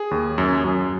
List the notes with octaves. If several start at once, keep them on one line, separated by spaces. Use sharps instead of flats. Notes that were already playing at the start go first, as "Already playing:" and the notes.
Already playing: G#4
D#2
F#2
F#2